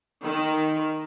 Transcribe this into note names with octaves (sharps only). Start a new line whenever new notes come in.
D#3